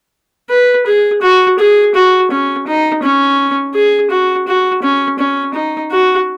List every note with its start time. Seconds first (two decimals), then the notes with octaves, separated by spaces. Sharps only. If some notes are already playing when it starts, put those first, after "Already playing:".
0.50 B4
0.86 G#4
1.22 F#4
1.59 G#4
1.95 F#4
2.31 C#4
2.67 D#4
3.03 C#4
3.74 G#4
4.11 F#4
4.47 F#4
4.83 C#4
5.19 C#4
5.54 D#4
5.91 F#4